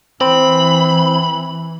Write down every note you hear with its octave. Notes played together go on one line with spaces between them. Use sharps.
E3 C4 B5